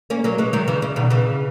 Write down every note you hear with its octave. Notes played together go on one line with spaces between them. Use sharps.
A#3 C#4
F#3 A#3
E3 G#3
D#3 F#3
C#3 E3
C#3
B2 D#3
C#3 E3